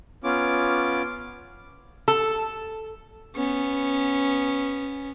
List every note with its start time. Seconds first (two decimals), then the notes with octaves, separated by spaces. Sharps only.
0.24 B3 C#4 F4 D6
2.08 A4
3.36 B3 C#4